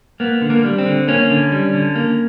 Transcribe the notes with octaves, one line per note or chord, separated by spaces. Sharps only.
A#3 B3
D3
A#3
G3
C4
D3
A#3 C#4
D3
G3
D3
A#3